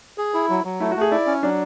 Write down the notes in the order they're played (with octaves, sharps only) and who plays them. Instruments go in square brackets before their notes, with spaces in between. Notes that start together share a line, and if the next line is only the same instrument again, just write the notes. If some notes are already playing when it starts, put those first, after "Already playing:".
[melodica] G#4
E4
F#3
F#3
[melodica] A3 [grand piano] E4
[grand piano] F#4
[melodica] A3 [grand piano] G#4
[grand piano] E4 [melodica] D5
[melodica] C#4
[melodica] F#3 [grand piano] D4